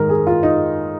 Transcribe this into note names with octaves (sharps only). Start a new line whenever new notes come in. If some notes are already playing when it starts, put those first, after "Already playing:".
Already playing: G#2 D#3 A#4
G#4
F4
D#4